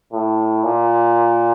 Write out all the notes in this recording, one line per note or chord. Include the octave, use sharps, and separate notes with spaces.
A2
A#2